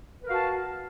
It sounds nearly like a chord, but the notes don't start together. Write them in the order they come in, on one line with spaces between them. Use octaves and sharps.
B4 A#4 F5 F#4 A5